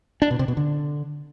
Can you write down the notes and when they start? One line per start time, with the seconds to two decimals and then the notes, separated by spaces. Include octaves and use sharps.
0.22 D4
0.31 B2
0.39 C3
0.48 B2
0.57 D3